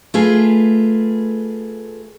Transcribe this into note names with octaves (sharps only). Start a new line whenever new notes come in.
A3 F4 G#4 B4